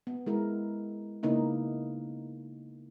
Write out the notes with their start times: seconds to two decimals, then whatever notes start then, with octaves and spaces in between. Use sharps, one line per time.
0.07 B3
0.26 G#3 E4 A#4
1.23 C#3 A#3 B3 D#4 E4